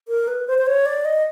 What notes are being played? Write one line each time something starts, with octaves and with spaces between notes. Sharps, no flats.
A#4
B4
C5
C5
C#5
D5
D#5